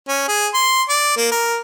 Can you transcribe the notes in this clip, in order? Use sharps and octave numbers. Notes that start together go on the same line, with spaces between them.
C#4
G#4
C6
D5
A#3
A#4